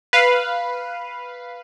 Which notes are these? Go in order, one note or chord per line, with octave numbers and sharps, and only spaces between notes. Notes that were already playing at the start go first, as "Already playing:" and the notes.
B4 F5